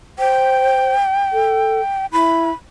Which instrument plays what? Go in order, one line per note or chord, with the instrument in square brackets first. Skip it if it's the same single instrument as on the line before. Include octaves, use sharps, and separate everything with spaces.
[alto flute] C5 [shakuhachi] G5
[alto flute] A4
[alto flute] E4 [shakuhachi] B5